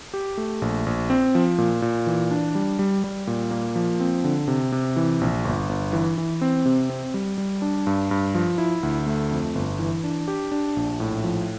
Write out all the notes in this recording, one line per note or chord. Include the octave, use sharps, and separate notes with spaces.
G4
A3
A#1
A#1
C4
F3
A#2
A#2
E3
D4
G3
G3
G3
A#2
A#3
F3
C4
D3
C3
C3
E3
A#1
G1
G1
E3
E3
C4
C3
C4
G3
G3
D4
G2
G2
F3
E4
D2
A3
F2
G1
E3
D4
G4
D4
A#1
A2
F3